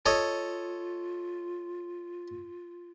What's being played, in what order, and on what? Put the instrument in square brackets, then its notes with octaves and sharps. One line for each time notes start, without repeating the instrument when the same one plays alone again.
[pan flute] F4 [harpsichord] A4 C#5 D#5